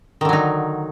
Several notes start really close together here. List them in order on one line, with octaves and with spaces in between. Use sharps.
D#3 D3 F#3 D#4